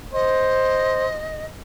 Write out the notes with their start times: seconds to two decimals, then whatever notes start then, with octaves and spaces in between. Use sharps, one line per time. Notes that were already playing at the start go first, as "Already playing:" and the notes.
0.13 C5 D#5